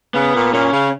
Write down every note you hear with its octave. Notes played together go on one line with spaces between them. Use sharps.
C#3 B3
A#2
A#2 C#4
C#3